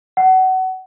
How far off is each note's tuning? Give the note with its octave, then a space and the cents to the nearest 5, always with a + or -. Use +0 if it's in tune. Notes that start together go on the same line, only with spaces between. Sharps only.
F#5 +25